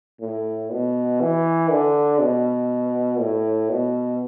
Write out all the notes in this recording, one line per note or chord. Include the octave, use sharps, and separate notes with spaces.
A2
B2
E3
D3
B2
A2
B2